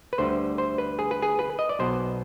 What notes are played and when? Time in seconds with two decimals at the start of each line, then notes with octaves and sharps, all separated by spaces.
0.13 B4
0.18 D2 D3 G3 C5
0.58 C5
0.78 B4
0.99 G#4
1.11 B4
1.22 G#4
1.39 B4
1.59 D#5
1.69 D5
1.79 B1 B2 B3 C5